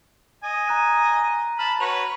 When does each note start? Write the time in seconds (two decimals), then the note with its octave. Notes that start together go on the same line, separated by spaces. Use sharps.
0.44 D#5 G#5
0.68 A#5 F#6 D#7
1.59 A5 B5 F6
1.80 F#4 B4 C#5 F7